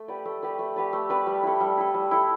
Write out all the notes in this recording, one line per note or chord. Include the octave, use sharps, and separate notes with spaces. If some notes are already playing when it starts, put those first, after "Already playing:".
Already playing: A3
G4 B4 D5
A3
G4 B4 D5
A3
G4 B4 D5
A3
G4 B4 D5
G3
E4 A4
G3
E4 A4
G3
E4 A4